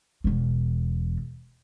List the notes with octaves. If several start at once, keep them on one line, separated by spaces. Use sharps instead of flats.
E1 E2